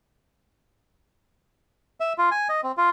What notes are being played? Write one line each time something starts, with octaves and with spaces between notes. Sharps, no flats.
E5
F4
G#5
D#5
C4
F4